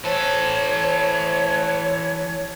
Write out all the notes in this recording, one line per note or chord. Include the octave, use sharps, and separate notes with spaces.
E3 A4 C5 C#5